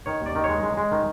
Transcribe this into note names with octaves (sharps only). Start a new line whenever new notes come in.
D#3 C#5
D#2 D5
D#3
G#3 C#5
G#3
G#3
D#3